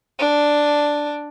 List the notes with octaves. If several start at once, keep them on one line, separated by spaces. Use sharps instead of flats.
D4